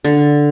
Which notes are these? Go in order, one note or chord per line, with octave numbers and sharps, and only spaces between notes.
D3